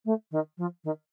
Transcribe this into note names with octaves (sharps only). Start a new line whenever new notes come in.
A3
D#3
F3
D#3